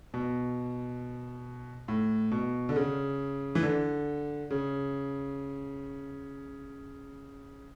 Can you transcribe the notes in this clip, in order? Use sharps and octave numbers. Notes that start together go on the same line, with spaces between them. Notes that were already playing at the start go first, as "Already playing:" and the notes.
B2
A2
B2
D3
C#3
E3
D3
C#3